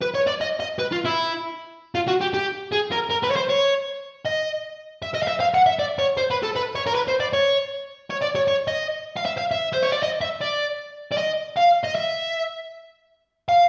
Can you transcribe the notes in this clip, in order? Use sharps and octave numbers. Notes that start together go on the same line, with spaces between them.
B4
C#5
D5
D#5
D#5
B4
F4
E4
F4
F#4
G4
G4
G#4
A#4
A#4
B4
C#5
C5
C#5
D#5
E5
D#5
F5
E5
F5
F#5
E5
D5
C#5
C5
B4
A4
B4
C#5
A#4
B4
C5
D5
C#5
C#5
D5
C#5
C#5
D#5
F5
E5
F5
E5
C5
C#5
D5
D#5
E5
D5
D5
D#5
F5
D#5
E5
F5